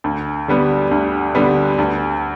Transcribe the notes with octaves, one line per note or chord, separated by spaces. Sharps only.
D2
D3 G3 B3
D2
D3 G3 B3
D2